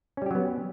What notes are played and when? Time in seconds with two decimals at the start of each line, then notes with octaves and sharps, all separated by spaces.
0.17 C#4
0.22 G3
0.26 G4
0.31 F#3
0.35 B3